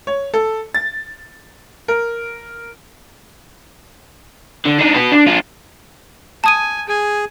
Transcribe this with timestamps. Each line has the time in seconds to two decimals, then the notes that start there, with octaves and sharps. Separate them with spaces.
0.07 C#5
0.34 A4
0.75 A6
1.88 A#4
4.65 D3
4.79 D4 D#4
4.94 F#4 B4
5.12 D4
5.27 D4 F4
6.44 G#5 A5 D#6 D#7
6.88 G#4 G#5